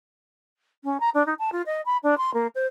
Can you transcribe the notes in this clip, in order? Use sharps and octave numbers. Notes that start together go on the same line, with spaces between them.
C#4
A#5
D4
D#4
A5
F4
D#5
B5
D4
C6
A#3
C5